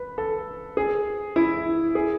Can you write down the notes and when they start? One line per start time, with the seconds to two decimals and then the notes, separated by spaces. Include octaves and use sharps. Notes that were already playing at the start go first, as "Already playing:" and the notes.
Already playing: B4
0.18 A4
0.77 G#4
1.36 E4
1.95 G#4